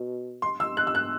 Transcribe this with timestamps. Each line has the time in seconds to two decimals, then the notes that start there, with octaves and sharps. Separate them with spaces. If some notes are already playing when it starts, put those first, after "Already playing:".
Already playing: B2
0.42 C6
0.60 E6
0.77 F#6
0.87 E6
0.95 F#6